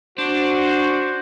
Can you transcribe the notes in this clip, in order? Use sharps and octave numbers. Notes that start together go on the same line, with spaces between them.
D4 F#4 C5